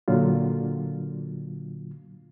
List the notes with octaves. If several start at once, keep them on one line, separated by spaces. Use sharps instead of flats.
A#2 D3 F#3 F4